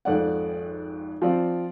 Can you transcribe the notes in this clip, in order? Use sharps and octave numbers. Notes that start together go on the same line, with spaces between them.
G#1 F2 D5 F#5
F3 C4 D5